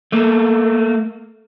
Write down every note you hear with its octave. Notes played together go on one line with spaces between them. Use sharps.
A3 A#3